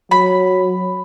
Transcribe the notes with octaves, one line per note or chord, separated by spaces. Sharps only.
F#3 B5